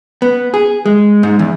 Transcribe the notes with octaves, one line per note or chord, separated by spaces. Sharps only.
B3
G#4
G#3
G#2
E2